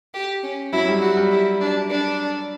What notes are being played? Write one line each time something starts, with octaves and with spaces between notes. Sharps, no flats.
G4
C#4
F#3 E4
G3
F#4
G3
E4
D4
D4